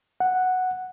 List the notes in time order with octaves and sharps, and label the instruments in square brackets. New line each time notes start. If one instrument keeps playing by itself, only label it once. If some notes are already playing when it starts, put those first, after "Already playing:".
[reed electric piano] F#5